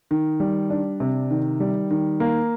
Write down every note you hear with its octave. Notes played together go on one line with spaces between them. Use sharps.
D#3
G3
D4
C3
D#3
G3
D#3
A#3